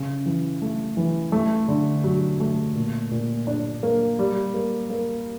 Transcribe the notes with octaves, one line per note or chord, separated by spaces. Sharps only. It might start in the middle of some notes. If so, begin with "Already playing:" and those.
Already playing: C#3
E3
A3
E3
A3
D3
F#3
A3
A#2
A#2
D4
A#3
G3
A#3
A#3